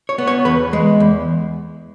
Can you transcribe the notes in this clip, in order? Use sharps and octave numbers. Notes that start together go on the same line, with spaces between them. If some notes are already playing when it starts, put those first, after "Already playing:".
C#5
B3
C#5
E2 B4
G#3
E2